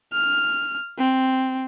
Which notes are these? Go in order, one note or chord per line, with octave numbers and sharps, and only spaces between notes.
F6
C4